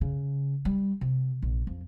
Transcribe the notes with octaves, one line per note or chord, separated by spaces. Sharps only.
C#3
G3
C3
A#1
F2